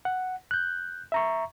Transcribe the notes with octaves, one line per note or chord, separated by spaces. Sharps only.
F#5
F#6 G6
E5 A#5 C#6